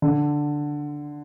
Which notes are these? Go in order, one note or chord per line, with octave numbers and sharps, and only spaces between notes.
D3